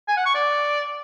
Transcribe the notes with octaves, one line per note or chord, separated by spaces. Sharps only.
G#5
F#5
C#6
D5